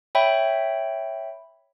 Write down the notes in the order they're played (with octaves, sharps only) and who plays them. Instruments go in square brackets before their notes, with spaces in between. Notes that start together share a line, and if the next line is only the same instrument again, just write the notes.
[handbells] C#5 E5 G5 B5